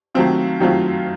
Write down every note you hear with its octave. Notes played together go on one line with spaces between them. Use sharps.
D#3 F#3 A3 C4 F4
D#3 F#3 A3 C4 F4